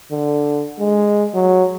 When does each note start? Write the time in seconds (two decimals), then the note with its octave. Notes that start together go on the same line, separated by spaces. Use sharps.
0.12 D3
0.80 G#3
1.34 F#3